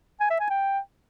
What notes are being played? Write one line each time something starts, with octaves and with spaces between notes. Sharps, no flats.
G#5
E5
G#5
G5